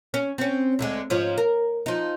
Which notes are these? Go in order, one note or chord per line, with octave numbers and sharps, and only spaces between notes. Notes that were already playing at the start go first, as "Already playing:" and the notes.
C#4
C4 C#4
D2 D3 G#3
G#2 F3 C#4
A#4
F3 D#4